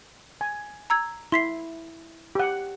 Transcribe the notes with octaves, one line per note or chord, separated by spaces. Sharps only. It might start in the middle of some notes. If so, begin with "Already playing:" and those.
G#5
A#5 E6 G#6
E4 C6 B6 C7
G4 F#5